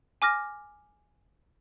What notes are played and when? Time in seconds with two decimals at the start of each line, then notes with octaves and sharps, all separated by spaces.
0.22 G#5 D6 F6 A#6